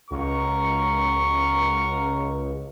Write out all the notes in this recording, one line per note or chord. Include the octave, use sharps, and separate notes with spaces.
C#2 F#4 A#4 C#6